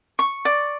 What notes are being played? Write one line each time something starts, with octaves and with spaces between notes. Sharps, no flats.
C#6
D5